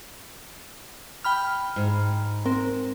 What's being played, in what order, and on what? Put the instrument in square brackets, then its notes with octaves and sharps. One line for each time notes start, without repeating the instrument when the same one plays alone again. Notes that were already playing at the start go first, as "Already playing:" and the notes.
[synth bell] G5 B5 F6
[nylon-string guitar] G#2
[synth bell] C4 A#4